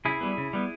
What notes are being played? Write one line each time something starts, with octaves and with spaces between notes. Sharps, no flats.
C#3 E4 G#4
G3 B3
C#3
G3 B3